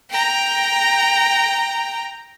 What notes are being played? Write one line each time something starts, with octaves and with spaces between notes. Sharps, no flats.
G5 A#5